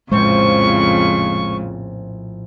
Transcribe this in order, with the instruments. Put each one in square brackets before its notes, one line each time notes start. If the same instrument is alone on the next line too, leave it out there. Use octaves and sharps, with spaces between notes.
[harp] A#1 A2 C5 [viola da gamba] F2 C#3 [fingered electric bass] G#3 [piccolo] C#6